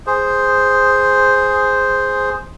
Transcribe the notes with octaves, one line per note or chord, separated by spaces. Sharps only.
G#4 C5